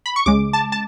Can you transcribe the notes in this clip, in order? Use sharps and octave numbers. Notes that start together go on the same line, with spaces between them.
B5
C#6
C#2 C#3 G#3 D6
A5
A5